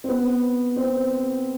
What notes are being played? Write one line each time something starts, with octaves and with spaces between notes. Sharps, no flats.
C4
B3
C4